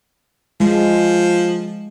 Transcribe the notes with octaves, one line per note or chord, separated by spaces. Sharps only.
F3 G#3